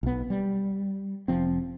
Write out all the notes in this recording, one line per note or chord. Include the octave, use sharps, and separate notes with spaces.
B1 B3
G3
F1 F3 C4